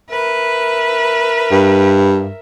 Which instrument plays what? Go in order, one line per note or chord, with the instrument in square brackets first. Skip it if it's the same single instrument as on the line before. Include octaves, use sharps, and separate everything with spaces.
[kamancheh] A#4 E5 [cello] B4
[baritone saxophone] G2